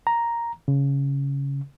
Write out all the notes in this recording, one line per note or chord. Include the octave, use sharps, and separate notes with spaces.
A#5
C#3